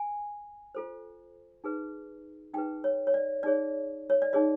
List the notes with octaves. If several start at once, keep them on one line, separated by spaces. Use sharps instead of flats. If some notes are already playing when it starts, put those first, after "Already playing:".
Already playing: G#5
F4 A4 C5
D#4 G#4 B4
D#4 G#4 B4 G5
C#5
C#5
D5
D#4 G#4 C#5 D5
C#5
D5
D#4 G#4 C#5 D#5